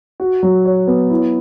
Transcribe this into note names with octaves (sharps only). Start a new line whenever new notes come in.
F#4
F#3
C#5
B3
E4